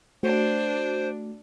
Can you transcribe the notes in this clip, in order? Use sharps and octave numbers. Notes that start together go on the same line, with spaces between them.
A3 D4 F#4 C5